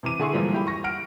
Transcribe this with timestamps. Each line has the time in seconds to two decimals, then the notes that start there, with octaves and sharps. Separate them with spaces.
0.03 C3 E3 D6 D#7
0.19 D3 E4 G#4 C6 C#6
0.33 G#2 E3 F3 G3 A3 A#3
0.52 E4 G4 B5
0.67 C#6 A#6
0.84 F#5 F6 D7